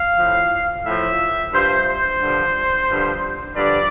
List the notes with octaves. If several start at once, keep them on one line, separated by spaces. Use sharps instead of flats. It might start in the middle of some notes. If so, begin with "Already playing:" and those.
Already playing: F5
A2 F3
A2 F3 E5
G2 F3 C5
C5
G2 D3 F3
G2 D3 F3
G2 D3 F3 D5